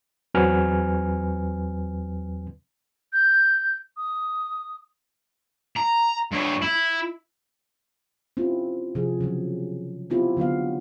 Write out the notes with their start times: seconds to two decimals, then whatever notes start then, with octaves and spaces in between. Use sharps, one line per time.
0.34 E2 F#3 C4 B4 G#5 F6
3.13 G6
3.97 D#6
5.76 A#5
6.31 G2 C#5
6.62 E4
8.37 C4 C#4 E4 F4 G4
8.95 C3 F3 G#4
9.21 C#3 F3 F#3
10.10 B3 C4 E4 F4 G4
10.37 D3 F#3 B3 F5